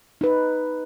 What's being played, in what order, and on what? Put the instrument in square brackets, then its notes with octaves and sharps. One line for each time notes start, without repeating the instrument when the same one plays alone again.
[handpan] D#4 B4